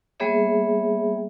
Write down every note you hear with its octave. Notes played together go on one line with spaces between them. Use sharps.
G3 A#3 B3 G#4 C#5 E5